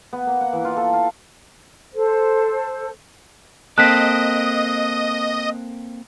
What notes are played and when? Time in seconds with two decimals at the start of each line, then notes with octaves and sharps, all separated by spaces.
0.13 B3
0.27 A#3
0.41 F#5
0.53 E3
0.65 F4
0.77 A4
0.93 F5
1.94 A4 C5
3.78 A#3 C4 A4 D#5 D#6 F#6 B6